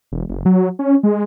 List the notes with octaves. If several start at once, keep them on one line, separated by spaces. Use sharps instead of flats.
E1
F#1
F#3
C#4
G#3